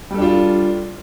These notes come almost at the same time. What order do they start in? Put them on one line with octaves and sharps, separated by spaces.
G3 A4 D4 F4